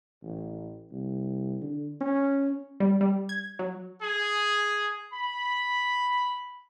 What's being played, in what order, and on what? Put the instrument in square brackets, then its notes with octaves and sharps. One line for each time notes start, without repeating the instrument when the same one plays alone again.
[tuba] A1
C2
D3
C#4
[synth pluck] G3
G3
G#6
F#3
[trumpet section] G#4
B5